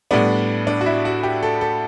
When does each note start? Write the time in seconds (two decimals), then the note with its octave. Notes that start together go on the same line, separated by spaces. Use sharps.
0.11 A2 G3 B3 D4
0.67 D4
0.81 F#4
0.86 E4
1.05 F#4
1.23 G4
1.43 A4
1.61 A4